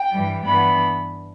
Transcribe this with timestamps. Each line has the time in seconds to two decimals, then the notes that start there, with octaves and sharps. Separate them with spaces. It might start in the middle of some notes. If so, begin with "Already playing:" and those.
Already playing: G5
0.11 G2 E3 G3
0.45 G2 E3 B3 D4 B5